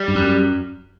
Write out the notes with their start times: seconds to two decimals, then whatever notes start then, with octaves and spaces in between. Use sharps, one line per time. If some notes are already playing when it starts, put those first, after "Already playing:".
Already playing: G3
0.08 G2
0.15 F#2